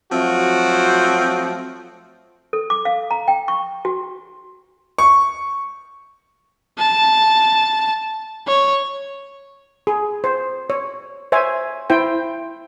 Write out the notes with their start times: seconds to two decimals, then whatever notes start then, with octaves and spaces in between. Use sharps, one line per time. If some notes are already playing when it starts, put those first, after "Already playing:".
0.12 F3 F#3 A3 C4 F#4
2.53 A4
2.70 D6
2.85 F5
3.11 A#5
3.28 G5
3.48 C#6
3.85 F#4
4.98 C#6
6.79 A5
8.47 C#5
9.87 G#4
10.24 C5
10.70 C#5
11.32 C5 C#5 E5 G#5
11.90 E4 C5 G5